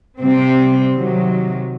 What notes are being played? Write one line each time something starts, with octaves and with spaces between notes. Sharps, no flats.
C3 G3 C4
C3 D#3 F#3